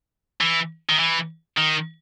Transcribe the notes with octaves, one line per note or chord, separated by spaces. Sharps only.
E3
D#3
E3
D#3